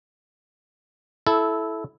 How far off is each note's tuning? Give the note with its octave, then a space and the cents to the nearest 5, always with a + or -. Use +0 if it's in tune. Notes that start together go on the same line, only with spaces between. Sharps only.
E4 +0 A4 -15